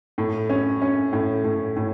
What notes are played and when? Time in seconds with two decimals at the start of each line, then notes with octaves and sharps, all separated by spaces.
0.18 A2
0.49 C#4
0.82 C#4
1.13 A2
1.44 A2
1.76 A2